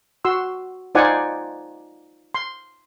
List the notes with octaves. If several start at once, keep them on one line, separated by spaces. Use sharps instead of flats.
F#4 C6 E6
D#4 F4 C5 D5 F#5 G#5
C6